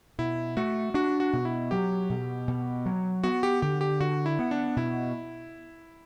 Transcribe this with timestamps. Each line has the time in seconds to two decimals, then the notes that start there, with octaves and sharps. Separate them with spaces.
0.19 B2 E4
0.57 A3 F#4
0.94 D4 F#4
1.20 F#4
1.33 B2
1.45 E4
1.71 F#3 G4
2.10 B2
2.48 B2
2.86 F#3
3.24 B3 F#4
3.43 G4
3.62 D3 G4
3.81 G4
4.00 D3 F#4
4.26 E4
4.39 B3
4.51 D4
4.76 B2 E4